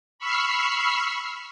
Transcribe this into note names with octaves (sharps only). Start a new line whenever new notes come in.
B5 C#6 E6 F6 C7